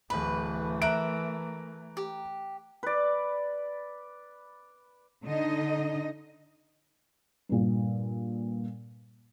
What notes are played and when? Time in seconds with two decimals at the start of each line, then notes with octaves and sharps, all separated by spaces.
0.10 D1 E3 A3 B4 B5
0.82 A#4 E5 A#5 F#6 D7
1.97 G4
2.83 B4 D5
5.23 D3 D#4 D#5
7.49 G2 A#2